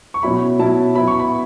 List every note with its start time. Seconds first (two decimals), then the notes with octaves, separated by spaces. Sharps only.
0.14 C#6
0.23 B2 F#3 C#4 E4 B5
0.59 B2 F#3 C#4 E4 A5
0.95 F#3 B3 E4 B5
1.07 C#6
1.19 B5